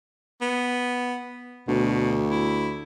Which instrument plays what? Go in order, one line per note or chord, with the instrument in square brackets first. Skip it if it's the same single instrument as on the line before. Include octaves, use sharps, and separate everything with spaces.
[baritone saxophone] B3
[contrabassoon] D2 [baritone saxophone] B2
[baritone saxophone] E4